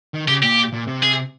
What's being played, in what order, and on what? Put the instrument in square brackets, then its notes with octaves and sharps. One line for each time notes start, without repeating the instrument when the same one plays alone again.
[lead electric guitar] D#3
[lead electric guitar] C#3 [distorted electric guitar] G4
[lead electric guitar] A#2 [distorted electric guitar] G4
[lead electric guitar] A#2
C3
[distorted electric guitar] G#4